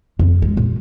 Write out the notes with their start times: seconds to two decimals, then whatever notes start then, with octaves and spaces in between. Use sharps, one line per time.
0.19 F2
0.42 G#3
0.57 A#2